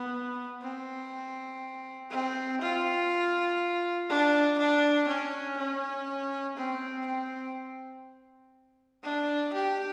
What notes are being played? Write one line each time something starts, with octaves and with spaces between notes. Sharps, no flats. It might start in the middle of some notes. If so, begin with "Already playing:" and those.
Already playing: B3
C4
C4
F4
D4
D4
C#4
C#4
C4
C4
D4
G4